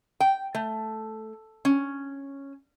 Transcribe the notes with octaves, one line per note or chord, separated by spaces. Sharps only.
G5
A3
C#4